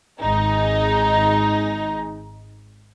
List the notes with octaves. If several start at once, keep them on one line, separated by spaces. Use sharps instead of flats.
G#1 G#3 D#4 G#4